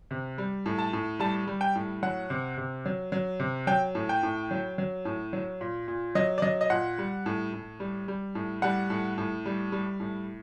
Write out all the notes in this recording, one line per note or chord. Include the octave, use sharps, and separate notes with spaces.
C3
G3
A2
A5
A2
G3 A5
G3
G5
A2
F#3 F#5
C3
C3
F#3
F#3
C3
F#3 G5
A2
G5
A2
F#3
F#3
A2
F#3
A#2
A#2
F#3 D#5
D5
F#3 D#5
D#5
A#2 F#5
G3
A2
A2
G3
G3
A2
G3 F#5
A2
A2
G3
G3
A2